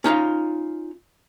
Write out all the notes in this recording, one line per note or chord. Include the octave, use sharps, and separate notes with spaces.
C#4 D#4 F4 F5